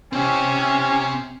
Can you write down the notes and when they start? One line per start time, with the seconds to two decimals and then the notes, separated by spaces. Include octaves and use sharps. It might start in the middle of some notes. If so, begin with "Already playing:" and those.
0.13 C4 C#4 G4